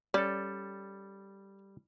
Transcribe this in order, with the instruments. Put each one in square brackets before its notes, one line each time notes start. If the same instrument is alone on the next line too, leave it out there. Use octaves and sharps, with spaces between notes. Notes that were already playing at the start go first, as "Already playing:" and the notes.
[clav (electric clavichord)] G3 A4 [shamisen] C#4 D5